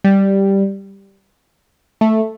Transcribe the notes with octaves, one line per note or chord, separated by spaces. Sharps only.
G3
A3